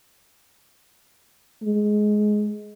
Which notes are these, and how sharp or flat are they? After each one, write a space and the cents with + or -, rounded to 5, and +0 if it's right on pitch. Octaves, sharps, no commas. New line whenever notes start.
G#3 +15